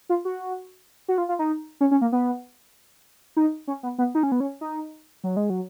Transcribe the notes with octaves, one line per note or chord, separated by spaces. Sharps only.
F4
F#4
F#4
F4
F4
D#4
C#4
C#4
A#3
B3
D#4
C#4
B3
B3
D#4
C#4
B3
C#4
D#4
F#3
G#3
F#3